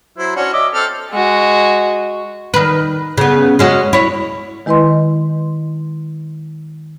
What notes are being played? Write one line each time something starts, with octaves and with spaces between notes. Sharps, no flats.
F#3 E4 C5
C#4 D4 F#4
D#5 E5 D6
C4 A4 F6
G#3 F#4
D#3 B4
C#3 B3
G#3 C#4 F#4
E4 C#5
D#3 G#3 E4 B4 D#5 C6